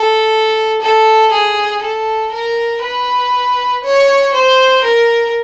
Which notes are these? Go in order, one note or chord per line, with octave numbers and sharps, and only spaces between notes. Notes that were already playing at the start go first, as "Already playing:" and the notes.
Already playing: A4
A4
G#4
A4
A#4
B4
C#5
C5
A#4